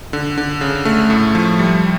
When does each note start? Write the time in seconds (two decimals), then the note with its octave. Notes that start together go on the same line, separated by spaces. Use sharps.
0.13 D3
0.38 D3
0.61 C#3
0.85 A3
1.10 A2
1.35 F3
1.59 G3